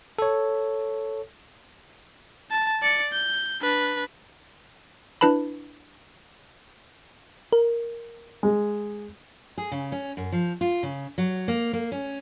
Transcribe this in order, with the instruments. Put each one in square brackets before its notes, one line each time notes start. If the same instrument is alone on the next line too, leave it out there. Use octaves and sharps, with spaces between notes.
[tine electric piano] A4 C#5
[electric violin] A5
D5 C#7
G6
D4 B4
[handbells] D4 E4 B4 A5 B5
[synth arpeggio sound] A#4
[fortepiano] G#3
[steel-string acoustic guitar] G#4
C#3
C#4
F#2
F3
F4
C#3
F#3
A#3
A#3
C#4